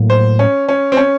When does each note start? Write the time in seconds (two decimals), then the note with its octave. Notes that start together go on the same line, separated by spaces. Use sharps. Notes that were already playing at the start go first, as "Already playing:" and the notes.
Already playing: A2 F#3 A#3
0.10 C5
0.39 C#4
0.69 C#4
0.92 C4
0.97 C#4